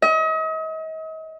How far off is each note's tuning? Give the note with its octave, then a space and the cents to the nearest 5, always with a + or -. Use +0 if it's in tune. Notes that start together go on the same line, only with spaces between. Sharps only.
D#5 +40